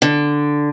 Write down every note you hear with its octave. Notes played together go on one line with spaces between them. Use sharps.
D3